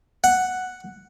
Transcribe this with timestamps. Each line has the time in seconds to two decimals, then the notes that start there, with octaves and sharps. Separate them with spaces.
0.24 F#5